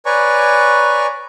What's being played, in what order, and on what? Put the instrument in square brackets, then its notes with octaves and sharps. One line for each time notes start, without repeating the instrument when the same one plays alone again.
[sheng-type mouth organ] B4 C#5 D5 G#5 A#5 C#6